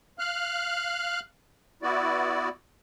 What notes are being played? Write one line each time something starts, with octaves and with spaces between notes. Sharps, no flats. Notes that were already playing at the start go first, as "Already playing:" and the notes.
F5 F6 F#6
B3 E4 F#4 D5